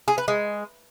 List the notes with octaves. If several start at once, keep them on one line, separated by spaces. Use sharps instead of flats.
G#4
B4
G#3